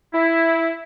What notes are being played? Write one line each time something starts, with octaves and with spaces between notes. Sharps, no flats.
E4